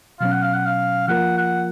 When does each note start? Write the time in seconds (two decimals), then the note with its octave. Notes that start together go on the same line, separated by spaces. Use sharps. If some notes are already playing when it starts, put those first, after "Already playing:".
0.20 B2 F#3 C#4 F5
0.32 F#5
0.43 F5
0.54 F#5
0.66 F5
1.08 F3 A#3 F4 A#4 F#5
1.37 F#5